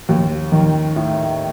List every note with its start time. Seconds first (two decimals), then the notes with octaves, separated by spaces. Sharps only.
0.09 D#2
0.52 D#3
0.96 A2